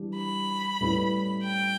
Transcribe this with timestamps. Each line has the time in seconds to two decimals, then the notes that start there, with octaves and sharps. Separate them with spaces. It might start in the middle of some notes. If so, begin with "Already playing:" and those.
Already playing: E3 G3 D4 G4
0.16 B5
0.81 A2 G3 C#4 E4 B4
1.44 G5